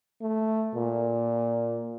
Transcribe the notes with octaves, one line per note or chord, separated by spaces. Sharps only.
A3
A#2